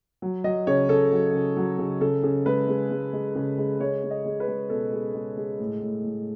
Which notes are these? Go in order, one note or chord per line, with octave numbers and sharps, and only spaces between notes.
F#3
F#3 D#5
C#3 C#5
C#3 A4
F#3
C#3
F#3
C#3
C#3 A4
C#3
G#3 B4
G#3
G#3
G#3
C#3
G#3
G#3 C#5
G#3
D#5
G#3
B4
G#3
B2 A4
G#3
G#3
G#3
A2
A2
A2